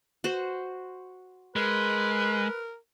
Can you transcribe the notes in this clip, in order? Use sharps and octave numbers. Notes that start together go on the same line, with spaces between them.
F#4 C5
G#3 A#4 B4